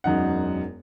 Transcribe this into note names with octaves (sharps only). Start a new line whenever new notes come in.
E1 F#2 D#4 F#5